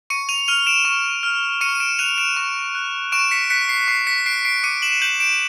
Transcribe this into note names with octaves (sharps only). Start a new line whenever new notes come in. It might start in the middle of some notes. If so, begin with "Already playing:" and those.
C#6 C#7 D#7
D#7 F7
F6 D#7 F7
D7 E7
C#6
F6
C#6 C#7 D#7
D#7
D7 E7
F#6 D#7 F7
D7 E7
C#6
F#6
C#6 D7 E7
B6 C#7
F#6 B6 C#7
C7
C#6 C7
B6 C#7
F#6 C7 D7
C7 D7
D6 C#7 D#7
E7 F#7
G6 E7 F#7
D7 E7